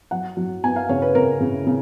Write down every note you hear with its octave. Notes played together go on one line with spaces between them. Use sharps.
F#3 F#5
F#3
B3 G#5
F5
C#3 C#5
B4
C#3 A#4
C#3
C#3